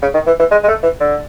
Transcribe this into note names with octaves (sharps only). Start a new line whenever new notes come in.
C#3
D#3
E3
E3
G#3
G#3
A3
E3
D3